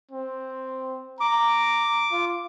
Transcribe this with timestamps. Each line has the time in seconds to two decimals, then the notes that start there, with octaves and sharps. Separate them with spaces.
0.11 C4
1.20 A#5 D6
2.12 F4